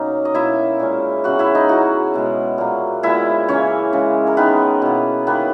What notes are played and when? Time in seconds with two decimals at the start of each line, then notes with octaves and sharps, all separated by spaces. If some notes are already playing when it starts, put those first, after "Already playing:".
Already playing: B2 F#3 A#3 C#4 D#4
0.25 D#5
0.34 B2 A#3 D#4 E4 E5
0.80 A#2 G#3 C#4
1.24 C#3 E3 B3 F#4 F#5
1.39 E4 E5
1.55 D#4 D#5
1.69 F#3 C#4 E4 F#4 F#5
2.14 B2 G#3 B3
2.58 A#2 F#3 A#3
3.03 A#2 G#3 B3 E4 E5
3.48 C#3 E3 A#3 C#4 C#5
3.93 C#3 E3 G#3
4.27 A#4
4.37 D#3 G#3 B3 D#4 B4
4.82 B2 A#3 E4
5.27 D#3 A#3 B3 C#4 E4 B4